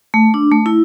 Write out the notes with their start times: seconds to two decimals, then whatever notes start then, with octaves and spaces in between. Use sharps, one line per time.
0.14 A3
0.34 D4
0.52 A3
0.66 E4